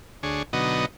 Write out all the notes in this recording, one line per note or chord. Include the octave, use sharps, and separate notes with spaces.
D2 D4 G#4 C#5
B2 D3 F#3 B3 D#4 D#5